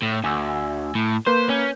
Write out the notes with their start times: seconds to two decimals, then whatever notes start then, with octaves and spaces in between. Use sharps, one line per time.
0.03 A2
0.24 D2 G#5 E6
0.95 A2
1.26 A#3 B4 C5 G6
1.49 C#4